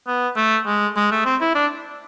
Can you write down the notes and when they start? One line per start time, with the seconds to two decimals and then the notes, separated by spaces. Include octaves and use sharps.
0.08 B3
0.37 A3
0.66 G#3
0.96 G#3
1.11 A3
1.25 C4
1.41 E4
1.55 D4